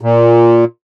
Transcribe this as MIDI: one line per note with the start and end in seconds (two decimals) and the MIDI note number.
0.01 0.65 46